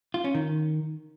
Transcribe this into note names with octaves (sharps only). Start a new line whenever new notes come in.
F4
C#4
D#3